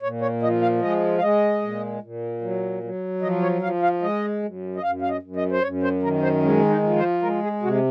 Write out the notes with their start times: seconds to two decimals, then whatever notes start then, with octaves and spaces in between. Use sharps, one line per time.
0.02 A#2 C#5
0.21 C#5
0.42 F3 D#5
0.61 F5
0.82 G#3 D#5
1.18 F5
1.21 G#3 D#5
1.62 A#2
2.02 A#2
2.42 F#3
2.83 F#3
3.22 F3 D#5
3.42 C#5
3.62 F3 F5
3.83 F5
4.02 G#3 D#5
4.43 F#2
4.76 D#5
4.83 F#2 F5
5.02 F5
5.09 D#5
5.22 F#2
5.36 D#5
5.52 C5
5.62 F#2 C#5
5.83 C5
6.02 D#3 A#4
6.22 C5
6.43 G#3 C#4
6.69 D#4
6.83 F3
6.96 C5
7.22 G#3 A#4
7.43 G#4
7.62 C3 F#4